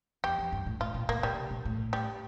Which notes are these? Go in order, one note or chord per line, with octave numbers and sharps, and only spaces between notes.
E2 G4
F2
G2
A2
A2 F4
A#2
A2 A#3
A#2 G3
C3
A#2
A2
G3